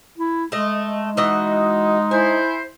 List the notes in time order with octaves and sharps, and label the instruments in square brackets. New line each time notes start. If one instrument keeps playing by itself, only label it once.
[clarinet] E4
[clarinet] G#3 [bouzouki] A3 D#5
[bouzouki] E3 F#4 D#5 [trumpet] D#4
[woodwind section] E4 C5 [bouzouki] G#5